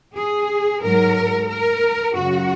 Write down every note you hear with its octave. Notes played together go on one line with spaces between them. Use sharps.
G#4
G#2 F#3 A#4
A#4
F#2 C#3 F#3 F#4